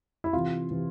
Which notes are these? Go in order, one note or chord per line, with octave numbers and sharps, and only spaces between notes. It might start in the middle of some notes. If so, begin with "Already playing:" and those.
E4
C3 E3 F4
C3 E3